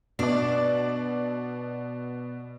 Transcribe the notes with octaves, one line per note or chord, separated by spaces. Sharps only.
B2 D4 D5